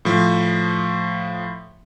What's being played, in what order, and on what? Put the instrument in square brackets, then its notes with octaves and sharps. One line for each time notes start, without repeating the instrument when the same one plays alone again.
[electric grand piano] A2 F3